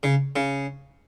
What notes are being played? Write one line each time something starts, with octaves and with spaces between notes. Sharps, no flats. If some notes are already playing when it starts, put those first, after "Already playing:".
C#3
C#3